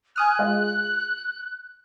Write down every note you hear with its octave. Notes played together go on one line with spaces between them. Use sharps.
G#5 D#6 F6 F#6
G#3 F4